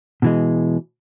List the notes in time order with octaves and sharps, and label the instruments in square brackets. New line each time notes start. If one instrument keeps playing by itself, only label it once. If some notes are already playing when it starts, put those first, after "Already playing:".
[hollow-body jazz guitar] B2 E3 G#3